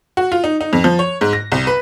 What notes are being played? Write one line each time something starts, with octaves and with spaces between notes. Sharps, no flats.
F#4
F4
D#4
D#4
F2
F3
C#5
G#2
A#6
C2
B4